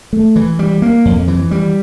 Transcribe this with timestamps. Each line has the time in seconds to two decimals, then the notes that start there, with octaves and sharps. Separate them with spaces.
0.13 A3
0.36 E3
0.59 G3
0.82 A#3
1.05 F2
1.28 E3
1.51 G3